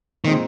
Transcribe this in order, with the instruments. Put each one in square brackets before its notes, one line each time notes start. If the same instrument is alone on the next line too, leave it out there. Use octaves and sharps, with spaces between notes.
[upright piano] A#2 G#3 C4 D#4 G#4 [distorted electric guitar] D#3